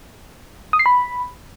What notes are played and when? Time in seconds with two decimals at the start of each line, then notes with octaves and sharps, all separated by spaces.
0.73 D#6
0.79 C7
0.86 B5